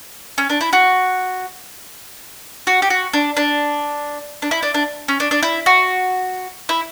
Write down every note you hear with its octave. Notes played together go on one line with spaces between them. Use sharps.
C#4
D4
E4
F#4
F#4
G4
F#4
D4
D4
D4
E4
D4
D4
C#4
D4
D4
E4
F#4
E4